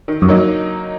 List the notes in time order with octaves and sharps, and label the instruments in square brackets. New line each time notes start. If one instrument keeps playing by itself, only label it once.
[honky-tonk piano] D#3
[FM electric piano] F#2
[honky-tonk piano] F#3 A#3 D#4